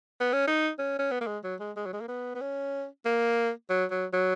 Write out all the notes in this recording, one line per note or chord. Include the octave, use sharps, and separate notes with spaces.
B3
C#4
D#4
C#4
C#4
B3
A#3
G#3
F#3
G#3
G#3
F#3
G#3
A#3
B3
B3
C#4
A#3
F#3
F#3
F#3